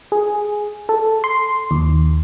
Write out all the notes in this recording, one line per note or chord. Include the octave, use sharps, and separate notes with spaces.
G#4
A4
C6
D#2